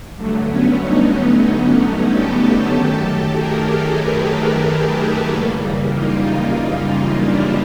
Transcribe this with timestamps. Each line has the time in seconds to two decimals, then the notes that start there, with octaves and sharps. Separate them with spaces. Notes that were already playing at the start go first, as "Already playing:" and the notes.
0.16 G2 D3 F#3 A3
0.48 B3 C#4
0.80 C#4 D#4
1.44 C#4 D#4
2.08 G4 A4
2.72 F#2 D#3 F#3 A3 G4 A4
3.36 G#4 A#4
4.01 A4 B4
5.30 F#2 C#3 E3 G3 A#3
5.93 D#4 F4
7.22 D4 E4